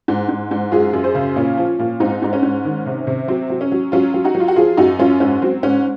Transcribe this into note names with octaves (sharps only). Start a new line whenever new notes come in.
G#2
G#2
G#2
F#2 F4 G#4
F#2
G#4 C5
C#3
A#2 C#4
F3
A#2
G#2 C4 D#4
G#2 D#4
C#4
G#2
D#3
C3
C3
F#3 C4
F#3
C#4
F#3
F#3 C#4 F4
F#3
D#4 F#4
F#3
F4
F#4
F3 F4 G#4
F#2 D#4 F#4
F#2 C#4 F4
G#2 C#4
F#3 C4
G#2 C#4